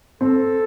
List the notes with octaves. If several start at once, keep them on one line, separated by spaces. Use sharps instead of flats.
C4 A4